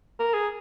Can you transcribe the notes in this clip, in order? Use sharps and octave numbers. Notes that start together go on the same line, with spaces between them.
A#4
G#4